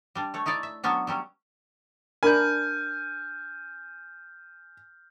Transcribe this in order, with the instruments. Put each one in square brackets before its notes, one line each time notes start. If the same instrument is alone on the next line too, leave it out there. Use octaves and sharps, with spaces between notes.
[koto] G3 D4
A3 C#5
D#4 E4 C#5 D5
E5
F#3 B3 C#4 D4
F#3 G3 C#4
[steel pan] D4 A#4 B5 [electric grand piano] G#5 [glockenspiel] F6 G6